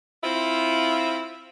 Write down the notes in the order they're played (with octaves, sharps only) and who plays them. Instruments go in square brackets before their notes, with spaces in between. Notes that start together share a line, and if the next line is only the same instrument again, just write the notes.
[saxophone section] C4 E4 F4